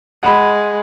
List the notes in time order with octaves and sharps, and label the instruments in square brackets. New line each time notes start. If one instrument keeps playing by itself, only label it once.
[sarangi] G#3 [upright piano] F#5 B5